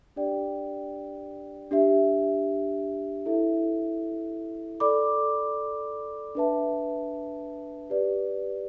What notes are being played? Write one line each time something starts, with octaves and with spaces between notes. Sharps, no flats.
D4 G4 D5 G5
D4 G4 E5
E4 A4 E5
A4 D5 B5 D6
D4 B4 E5 A5
G4 B4 D5